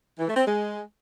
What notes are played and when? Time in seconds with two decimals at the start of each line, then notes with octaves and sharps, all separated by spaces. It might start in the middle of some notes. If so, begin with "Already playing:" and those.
0.19 E3
0.28 A3
0.36 C4
0.45 G#3